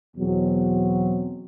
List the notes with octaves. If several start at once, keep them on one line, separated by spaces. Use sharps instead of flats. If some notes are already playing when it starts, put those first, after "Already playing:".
E2 B2 F#3 C4